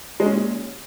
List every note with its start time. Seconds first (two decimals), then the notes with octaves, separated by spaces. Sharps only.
0.20 G#3
0.26 C#4
0.32 A#2